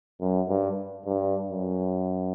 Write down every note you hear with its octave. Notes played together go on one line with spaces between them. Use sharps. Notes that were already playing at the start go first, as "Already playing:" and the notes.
F#2
G2
G2
F#2